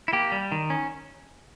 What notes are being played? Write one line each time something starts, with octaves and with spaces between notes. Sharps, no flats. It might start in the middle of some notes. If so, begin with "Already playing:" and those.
E4
A#3 G4
G3
D#3
C#4